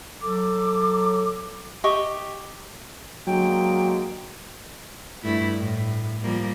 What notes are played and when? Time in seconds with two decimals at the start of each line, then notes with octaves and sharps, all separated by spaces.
0.23 F#3 A4 D6
1.84 G4 D#5 C#6
3.27 D3 F#3 G#3 A#3 G5
5.24 G2 A3 E4
5.59 A2
6.22 F3 G3 A#3